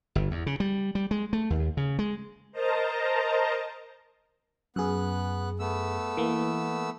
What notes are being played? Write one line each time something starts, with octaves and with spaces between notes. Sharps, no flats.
G1
E2
C#3
G3
G3
G#3
A3
D#2
C#3
G#3
A#4 C5 D#5 A5 A#5
F#2 B3 G#4 F#6
A3 B3 E6
E3 A#3